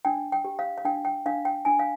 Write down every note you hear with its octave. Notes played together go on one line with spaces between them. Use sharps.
D4 G5
G5
G4
F5
F5
D4 G5
G5
D4 F5
G5
D4 G#5
F5